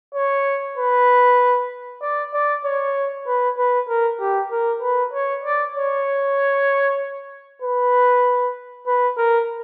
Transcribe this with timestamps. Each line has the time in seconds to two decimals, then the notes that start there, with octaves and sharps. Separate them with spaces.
0.15 C#5
0.77 B4
2.02 D5
2.34 D5
2.65 C#5
3.27 B4
3.58 B4
3.88 A#4
4.20 G4
4.51 A#4
4.82 B4
5.13 C#5
5.44 D5
5.75 C#5
7.62 B4
8.87 B4
9.17 A#4